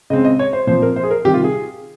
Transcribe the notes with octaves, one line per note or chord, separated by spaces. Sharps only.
C#3 G#3 C4 D#5
D#5
C#5
C5
A#2 F3 C4 C5
A#4
C5
G#4
A#4
C3 D#3 G3 G4
F4
G#4